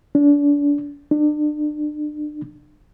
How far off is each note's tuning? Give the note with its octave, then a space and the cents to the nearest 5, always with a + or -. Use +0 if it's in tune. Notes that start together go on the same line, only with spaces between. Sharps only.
D4 -30
D4 +35